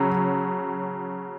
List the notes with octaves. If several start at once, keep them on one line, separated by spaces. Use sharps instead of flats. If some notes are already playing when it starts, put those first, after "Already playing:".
Already playing: C#3 F#3